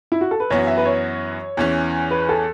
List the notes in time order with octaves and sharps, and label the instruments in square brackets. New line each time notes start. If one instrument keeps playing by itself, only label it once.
[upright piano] E4
F#4
A4
B4
[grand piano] F#2 E3 B3 F#4 [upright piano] C#5
[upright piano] E5
B4
C#5
[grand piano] E2 E3 C#4
[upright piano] B4
A4